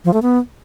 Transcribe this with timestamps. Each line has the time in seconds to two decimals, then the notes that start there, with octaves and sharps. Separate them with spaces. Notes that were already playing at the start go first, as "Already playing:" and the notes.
0.05 F3
0.14 A3
0.22 B3